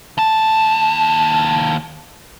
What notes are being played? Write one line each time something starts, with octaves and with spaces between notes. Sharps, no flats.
D#2 A5